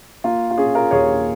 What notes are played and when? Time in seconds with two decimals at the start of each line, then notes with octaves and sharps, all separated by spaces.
0.24 A#3 F4
0.51 F4
0.57 C#4 G#4
0.75 F4 A#4
0.91 D#2 G#4 C#5